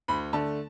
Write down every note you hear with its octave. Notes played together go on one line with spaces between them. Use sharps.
D2 B5
D3 A3 A5